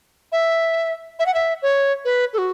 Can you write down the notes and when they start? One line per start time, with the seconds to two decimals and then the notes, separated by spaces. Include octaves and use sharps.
0.32 E5
1.19 E5
1.26 F#5
1.34 E5
1.62 C#5
2.05 B4
2.33 A4
2.38 F#4